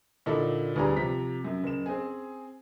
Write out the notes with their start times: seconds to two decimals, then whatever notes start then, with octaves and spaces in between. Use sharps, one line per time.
0.26 A#2 D3 D#4 E4 A4
0.76 D2 E3 G3 G#4 A#5
0.96 C3 F3 A#5 B6
1.44 F#2
1.64 F#1 E7
1.86 C4 G#4